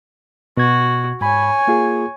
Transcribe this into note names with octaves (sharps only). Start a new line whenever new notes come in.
B2 F#4 G#6
G#2 C#5 G#5 B5
A#3 F4 G#4